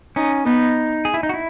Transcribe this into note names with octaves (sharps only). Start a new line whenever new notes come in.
C#4 D#4
B3 D#4
G#4
E4
D#4
F#4
E4